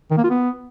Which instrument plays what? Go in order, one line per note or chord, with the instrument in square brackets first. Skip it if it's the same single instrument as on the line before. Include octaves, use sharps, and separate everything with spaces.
[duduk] D#3
A#3
F4
B3